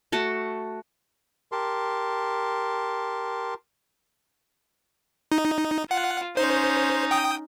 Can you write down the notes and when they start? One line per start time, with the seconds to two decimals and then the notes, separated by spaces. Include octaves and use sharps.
0.12 A3 F#4 A5
1.52 G4 A#4 A5 C6
5.32 D#4
5.91 F4 F#5
6.37 C#4 D#4 C5
7.11 G5 D#6